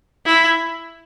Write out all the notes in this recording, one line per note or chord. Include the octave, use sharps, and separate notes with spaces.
E4